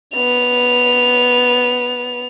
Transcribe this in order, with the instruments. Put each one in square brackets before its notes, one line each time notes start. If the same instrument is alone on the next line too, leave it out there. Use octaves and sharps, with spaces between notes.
[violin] B3 F7